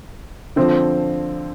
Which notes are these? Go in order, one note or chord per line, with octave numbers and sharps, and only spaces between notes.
D3 F3 C4